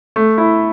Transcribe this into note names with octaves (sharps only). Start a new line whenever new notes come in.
A3
E4